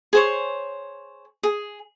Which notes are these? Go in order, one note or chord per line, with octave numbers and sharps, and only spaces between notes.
G#4 C5 C#5
G#4